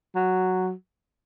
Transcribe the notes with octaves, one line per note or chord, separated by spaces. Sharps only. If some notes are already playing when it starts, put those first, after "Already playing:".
F#3